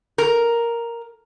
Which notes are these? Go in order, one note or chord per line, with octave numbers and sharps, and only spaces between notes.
A#4